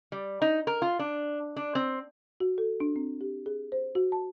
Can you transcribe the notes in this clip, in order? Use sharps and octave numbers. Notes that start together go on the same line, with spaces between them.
G3
D#4
A#4
F4
D4
D4
C4
F#4
A4
D4
C4
G4
G#4
C5
F#4
A5